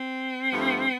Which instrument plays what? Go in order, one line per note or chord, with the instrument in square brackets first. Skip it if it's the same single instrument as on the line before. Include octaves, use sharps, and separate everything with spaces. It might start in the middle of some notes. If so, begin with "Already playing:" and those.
Already playing: [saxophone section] C4
G2 F3 A3